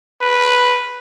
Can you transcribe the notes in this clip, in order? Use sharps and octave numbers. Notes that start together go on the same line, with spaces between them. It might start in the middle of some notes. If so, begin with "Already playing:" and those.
B4